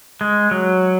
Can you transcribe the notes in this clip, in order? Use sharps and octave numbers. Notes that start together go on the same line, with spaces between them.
G#3
F#3